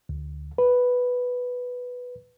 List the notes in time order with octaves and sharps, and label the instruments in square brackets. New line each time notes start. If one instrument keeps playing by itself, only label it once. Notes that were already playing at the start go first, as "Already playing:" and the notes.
[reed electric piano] D2
B4